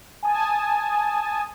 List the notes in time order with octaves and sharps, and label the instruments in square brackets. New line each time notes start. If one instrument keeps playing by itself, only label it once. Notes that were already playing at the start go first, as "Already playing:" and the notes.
[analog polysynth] G#5 A5 D#6